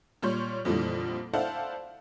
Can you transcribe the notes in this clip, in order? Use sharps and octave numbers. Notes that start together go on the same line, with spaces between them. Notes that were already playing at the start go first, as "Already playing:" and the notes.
A#2 G3 C#5 C6 G6
F2 A#2 D3 E3 G3
E4 A4 C5 D5 F5 F#5